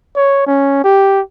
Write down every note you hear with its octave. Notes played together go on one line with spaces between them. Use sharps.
C#5
C#4
G4